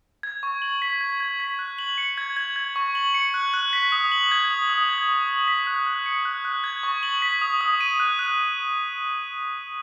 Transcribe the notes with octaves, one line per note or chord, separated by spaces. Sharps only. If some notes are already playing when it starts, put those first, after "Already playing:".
G#6
C#6
F#7
B6
G#6
G#6
B6
F#6
F#7
C#7
G#6
G#6
G#6
C#6
F#7
C#7
F#6
F#6
B6
D#6
F#7
G#6
D#6
D#6
G#6
C#6
F#7
B6
F#6
F#6
C#7
F#6
F#6
G#6
C#6
F#7
B6
D#6
D#6
D#7
F#6
F#6